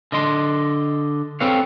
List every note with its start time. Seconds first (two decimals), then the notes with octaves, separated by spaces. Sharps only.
0.12 D3 D#5 C6
1.40 C4 A4 B4 C#5 F5